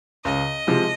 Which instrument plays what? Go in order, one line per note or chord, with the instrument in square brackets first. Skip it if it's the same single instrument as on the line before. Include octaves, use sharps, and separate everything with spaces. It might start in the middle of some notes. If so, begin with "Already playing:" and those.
[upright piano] C#2 [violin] D#5
[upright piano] C3 F3 G#3